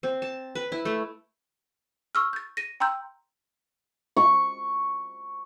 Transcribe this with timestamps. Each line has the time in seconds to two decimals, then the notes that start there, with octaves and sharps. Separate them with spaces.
0.03 C4
0.22 A5
0.55 B4
0.72 E4
0.85 A3
2.15 C#6 E6 F6
2.33 G6 A6
2.57 A#6 D#7
2.80 G5 A#5 C6 E6 G6
4.17 C#6